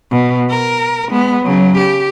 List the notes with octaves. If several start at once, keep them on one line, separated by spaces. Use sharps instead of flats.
B2
A#4
G#3 B3
C#3 F#3
G4